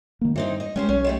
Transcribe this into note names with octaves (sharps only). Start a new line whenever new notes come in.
D#3 A#3
G2 E3 C4 D#4
D#5
G#3 C#4 G4 C5
B1 C#4
G#3 A3 G4